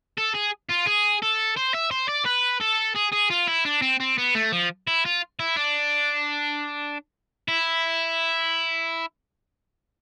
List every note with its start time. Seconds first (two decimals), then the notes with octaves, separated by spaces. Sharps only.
0.18 A4
0.34 G#4
0.69 F4
0.86 G#4
1.22 A4
1.56 C5
1.74 E5
1.91 C5
2.09 D5
2.26 B4
2.61 A4
2.96 G#4
3.13 G#4
3.31 F4
3.48 E4
3.65 D4
3.82 C4
4.00 C4
4.18 B3
4.35 A3
4.52 F3
4.87 E4
5.05 F4
5.39 E4
5.56 D4
7.48 E4